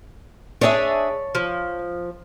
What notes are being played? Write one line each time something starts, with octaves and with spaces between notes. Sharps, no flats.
D4 G#4 C#5 E5 A5
F3